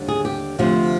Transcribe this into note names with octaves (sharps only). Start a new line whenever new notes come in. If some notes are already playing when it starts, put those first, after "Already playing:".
Already playing: D#2 D3 G3
G#4
G4
D2 C3 F3